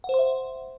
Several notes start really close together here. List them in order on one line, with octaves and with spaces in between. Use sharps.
F#5 C5 C6 E5